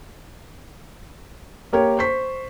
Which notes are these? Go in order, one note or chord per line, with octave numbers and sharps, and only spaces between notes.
A#3 G4 A#4 C#5
C5 C#6 B6